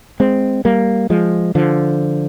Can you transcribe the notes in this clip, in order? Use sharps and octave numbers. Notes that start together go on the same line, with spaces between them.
G#3 C4
G3 A#3
F3 G#3
D3 F3